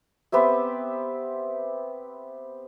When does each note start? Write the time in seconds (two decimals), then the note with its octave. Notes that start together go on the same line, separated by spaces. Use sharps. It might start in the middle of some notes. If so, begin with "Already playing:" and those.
0.32 B3 C4 G4 E5